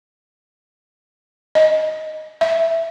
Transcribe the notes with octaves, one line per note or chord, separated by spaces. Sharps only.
D#5
E5